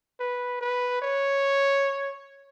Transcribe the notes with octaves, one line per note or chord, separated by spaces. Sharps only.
B4
B4
C#5